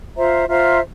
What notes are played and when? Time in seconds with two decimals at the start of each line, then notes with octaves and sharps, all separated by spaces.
0.17 F4 C5 E5 A#5
0.49 F4 C5 E5 A#5